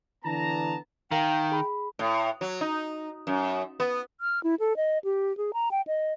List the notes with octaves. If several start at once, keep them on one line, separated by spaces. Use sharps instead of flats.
D3 E3 B3 A5 A#5
D#3 A#4 F5 G5 A#5
G#4 B5
A2
F#3
D#4
F#2
B3
F6
E4
A4
D#5
G4
G#4
A#5
G5
D#5